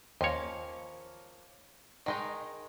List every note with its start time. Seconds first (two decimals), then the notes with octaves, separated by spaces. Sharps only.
0.21 D#2 F3 A#3 C#4 C#5
2.06 D#3 G#3 D#4